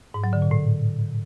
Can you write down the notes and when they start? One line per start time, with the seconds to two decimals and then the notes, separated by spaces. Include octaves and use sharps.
0.14 G#2
0.24 F#3
0.33 D3
0.42 A#2
0.51 A2